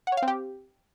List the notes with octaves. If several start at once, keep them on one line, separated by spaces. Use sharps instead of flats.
F#5
C#5
F5
C4
G4